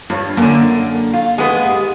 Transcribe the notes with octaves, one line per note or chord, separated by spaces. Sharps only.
G2 F4 C#5
F#2 D3 A#3
F4
G#3 B3 D#4
G4 F5